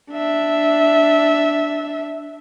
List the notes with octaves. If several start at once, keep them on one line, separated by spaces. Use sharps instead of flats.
D4 E5